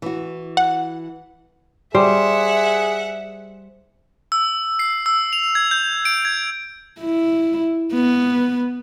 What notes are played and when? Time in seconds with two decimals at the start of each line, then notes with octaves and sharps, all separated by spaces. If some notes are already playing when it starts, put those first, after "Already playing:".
0.02 E3 F#4
0.57 F#5
1.94 G3 G#4 C5 E5 F#5
4.32 E6
4.79 C7
5.06 E6
5.33 F7
5.55 G#6
5.71 G6
6.05 D7
6.25 G#6
7.00 E4
7.94 B3